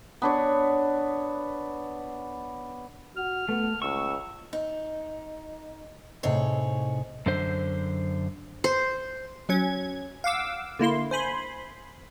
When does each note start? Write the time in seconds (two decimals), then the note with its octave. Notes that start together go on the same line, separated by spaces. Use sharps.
0.22 B3 D4 C#5
3.16 F#4 F6
3.49 A3 B3
3.82 C#2 C#6 E6
4.53 D#4
6.23 A2 C3 D#4 G#4 C#5 C7
7.26 F#2 D3 C5
8.64 C5
9.49 F#3 C#4 G#6
10.24 F5 F#5 D6 E6
10.79 D3 A#3 E4 C6
11.11 C5 G#5 B5 C6